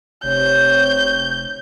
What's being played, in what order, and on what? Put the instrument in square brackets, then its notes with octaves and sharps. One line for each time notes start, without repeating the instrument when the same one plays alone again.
[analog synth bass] F1 [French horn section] C3 C#5 [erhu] G6